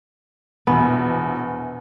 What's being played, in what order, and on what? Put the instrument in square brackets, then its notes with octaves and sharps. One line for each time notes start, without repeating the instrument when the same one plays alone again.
[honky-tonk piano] A#1 E2 B2 [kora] B3